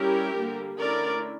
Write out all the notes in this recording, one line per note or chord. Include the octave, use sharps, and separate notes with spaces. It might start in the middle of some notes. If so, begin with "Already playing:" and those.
Already playing: G3 C#4 E4 G4 A#4
D3 G3 A#3
D3 A3 C#4 E4 A#4 D5